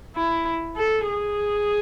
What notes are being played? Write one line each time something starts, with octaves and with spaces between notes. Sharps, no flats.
E4
A4
G#4